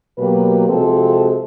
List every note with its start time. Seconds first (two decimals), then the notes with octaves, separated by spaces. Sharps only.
0.18 B2 F#3 A#3 G4 B4
0.68 C3 F3 G#3 C4 F#4 A4